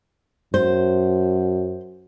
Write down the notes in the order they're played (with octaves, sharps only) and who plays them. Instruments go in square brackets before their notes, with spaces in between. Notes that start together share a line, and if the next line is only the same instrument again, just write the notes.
[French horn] F#2 [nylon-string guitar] C5